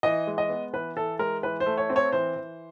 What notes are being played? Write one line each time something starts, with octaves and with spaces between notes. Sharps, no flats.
E3 D#5
G#3
D#5
B3
E3 B4
E3 A4
G#3 A#4
E3 B4
C5
A3
C#5
C4
C#5
E3 C5
E3